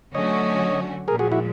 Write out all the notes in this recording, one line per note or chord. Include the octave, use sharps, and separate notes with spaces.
D3 F#3 A3 C#4 F#4 C#5 D#5
A#2 F3 G#3 G#4 A#4
F#4 G#4
E4 F#4